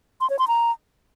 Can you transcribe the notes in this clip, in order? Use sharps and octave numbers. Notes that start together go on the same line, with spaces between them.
C6
C#5
C6
A#5